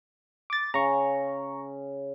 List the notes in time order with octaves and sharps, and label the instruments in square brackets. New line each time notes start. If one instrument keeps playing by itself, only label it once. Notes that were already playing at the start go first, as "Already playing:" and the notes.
[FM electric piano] D6 A6
[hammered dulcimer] C#3 [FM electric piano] A#5 C#6